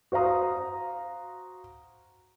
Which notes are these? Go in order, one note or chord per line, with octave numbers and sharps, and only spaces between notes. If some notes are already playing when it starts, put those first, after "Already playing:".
F#4 C5 F5 A#5 D#6